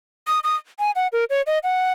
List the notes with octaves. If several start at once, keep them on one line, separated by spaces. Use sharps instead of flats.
D#6
D#6
G#5
F#5
A#4
C#5
D#5
F#5